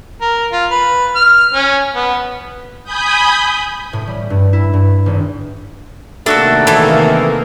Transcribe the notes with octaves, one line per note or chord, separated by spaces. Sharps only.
A#4
F4
B4
F6
C#4
B3
G#5 B5 D#6 G6
A2
G3
G2
E4
G2
G#1
C3 D#3 A3 A#3 D4 F#4 A4 E6
E3 A4